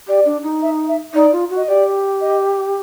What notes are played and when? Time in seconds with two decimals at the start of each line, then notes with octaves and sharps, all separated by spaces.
0.07 G4 D5
0.25 D4
0.43 D#4
0.62 E5
0.88 E5
1.14 D#4 D5
1.32 F4
1.50 F#4
1.56 D#5
1.68 G4 D5
2.21 D#5